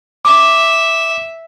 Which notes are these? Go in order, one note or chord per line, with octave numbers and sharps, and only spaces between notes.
E5 D6